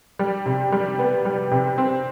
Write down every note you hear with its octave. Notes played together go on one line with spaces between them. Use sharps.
G3
C3
G3
B3
G3
C3
C4